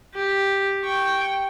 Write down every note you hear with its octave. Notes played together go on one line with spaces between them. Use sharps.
G4
G5 C#6